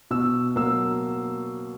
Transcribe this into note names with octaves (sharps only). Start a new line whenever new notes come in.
B2 E6
F#3 A#3 E6